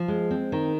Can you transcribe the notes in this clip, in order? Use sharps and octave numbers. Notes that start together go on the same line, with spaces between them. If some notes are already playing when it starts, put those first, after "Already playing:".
Already playing: F3
G#3
C4
D#3